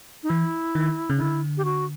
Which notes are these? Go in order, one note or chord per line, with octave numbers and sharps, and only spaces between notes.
D#4
E3 E4
D#3
C#3
D#4
D3 E4
G4
F#4